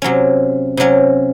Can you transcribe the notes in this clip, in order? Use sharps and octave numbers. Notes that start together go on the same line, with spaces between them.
C3 F#3 C#4
C3 F#3 C#4